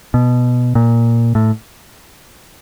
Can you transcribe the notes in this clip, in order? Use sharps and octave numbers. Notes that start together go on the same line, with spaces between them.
B2
A#2
A2